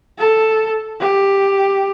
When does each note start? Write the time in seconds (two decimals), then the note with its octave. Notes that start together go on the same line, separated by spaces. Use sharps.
0.18 A4
1.00 G4